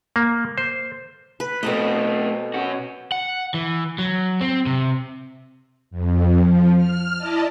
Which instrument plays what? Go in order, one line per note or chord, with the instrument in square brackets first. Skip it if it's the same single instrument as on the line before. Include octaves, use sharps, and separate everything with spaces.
[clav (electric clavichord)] A#3
C5
[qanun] B4
[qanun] B2 A#4 D#5 [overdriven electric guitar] A3 C4
[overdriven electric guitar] C#4 F#4
F#5
E3
F#3
C4
C3
[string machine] F2
F3
F6
E4 D5 D#5 A5